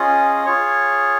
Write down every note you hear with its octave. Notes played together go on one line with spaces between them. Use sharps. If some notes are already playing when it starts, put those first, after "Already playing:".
Already playing: C#4 F4 G#4 D#5
F4 G#4 C#5